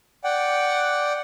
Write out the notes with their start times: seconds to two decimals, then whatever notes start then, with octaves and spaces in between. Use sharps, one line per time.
0.24 D5 F#5 G5